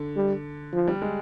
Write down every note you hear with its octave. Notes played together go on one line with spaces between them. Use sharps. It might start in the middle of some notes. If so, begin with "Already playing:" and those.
Already playing: D3
G3
F3
G3
G#3